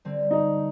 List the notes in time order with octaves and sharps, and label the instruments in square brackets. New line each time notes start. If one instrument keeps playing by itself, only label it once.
[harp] D3 G3 C4
[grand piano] D#4